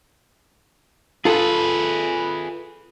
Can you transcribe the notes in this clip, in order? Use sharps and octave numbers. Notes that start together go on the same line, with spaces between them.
F4 G#4 A4 B4